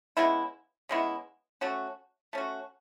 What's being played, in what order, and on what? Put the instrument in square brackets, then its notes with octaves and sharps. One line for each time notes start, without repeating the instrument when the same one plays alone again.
[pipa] C#3 G#3 B3 E4
C#3 G#3 B3 E4
A3 C#4 F#4
A3 C#4 F#4